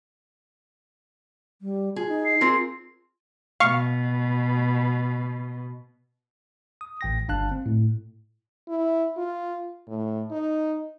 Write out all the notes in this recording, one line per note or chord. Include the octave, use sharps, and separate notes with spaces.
G3
F4 G#4
D#4
C7
C4 F4 G#4 A#4
B2 F5 C#6
D#6
A1 G5 A#6
G1 D4 F5 A5 F#6
C4
A2
E4
F4
A2
D#4